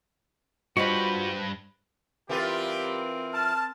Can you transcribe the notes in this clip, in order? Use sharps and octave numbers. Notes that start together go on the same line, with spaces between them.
G2 G3 F4 F#4 B4 C5 D#5 B5
E3 G3 B3 C4 F4 G4 A#4 B4
A5 F6